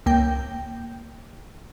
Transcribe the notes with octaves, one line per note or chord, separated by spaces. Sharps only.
C#2 A#3 G5 G6